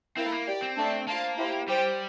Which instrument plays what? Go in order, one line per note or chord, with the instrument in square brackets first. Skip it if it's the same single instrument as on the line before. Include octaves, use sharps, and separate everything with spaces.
[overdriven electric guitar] C4 [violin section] E4 A#4 F5
[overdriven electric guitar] A3
A#3
[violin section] G4 D5 G5
[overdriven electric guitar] C4
[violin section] A3 D4 A4 E5 A5
[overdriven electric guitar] A#3 [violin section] F4 C5 F5 A5
[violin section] E4 G4 C5
[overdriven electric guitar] G3 [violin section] G4 C5 G5